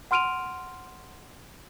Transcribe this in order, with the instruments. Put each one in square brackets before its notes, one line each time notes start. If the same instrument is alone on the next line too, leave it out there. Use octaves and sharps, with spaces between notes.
[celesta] F#5 C6 F6 D7 D#7 F7